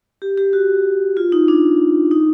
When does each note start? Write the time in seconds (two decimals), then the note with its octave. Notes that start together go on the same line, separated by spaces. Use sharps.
0.22 G4
0.38 G4
0.53 F#4
1.17 F4
1.32 D#4
1.48 D4
2.11 D#4